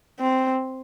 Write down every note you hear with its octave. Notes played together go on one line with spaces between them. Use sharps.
C4